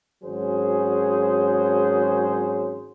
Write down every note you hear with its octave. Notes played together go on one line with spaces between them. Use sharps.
G#1 F#3 C#4 G#4 C5